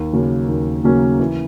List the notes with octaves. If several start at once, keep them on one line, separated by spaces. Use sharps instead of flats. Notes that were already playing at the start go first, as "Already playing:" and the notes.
Already playing: D#2
C#3 F#3 A#3 C#4
D#2
C#3 F#3 A#3 C#4
E3